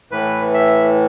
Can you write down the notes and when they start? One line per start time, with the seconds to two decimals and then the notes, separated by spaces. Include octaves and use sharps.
0.11 A2 E3 B4
0.54 E5